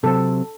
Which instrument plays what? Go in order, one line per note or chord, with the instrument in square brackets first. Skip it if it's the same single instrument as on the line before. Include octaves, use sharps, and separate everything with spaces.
[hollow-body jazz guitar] C3 F#3 C4 [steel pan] A4